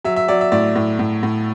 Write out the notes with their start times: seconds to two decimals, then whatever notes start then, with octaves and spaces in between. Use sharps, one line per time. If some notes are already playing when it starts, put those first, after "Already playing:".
0.04 F#3 E5
0.16 E5
0.28 F#3 D5
0.41 E5
0.52 A2 D5
0.75 A2
0.99 A2
1.23 A2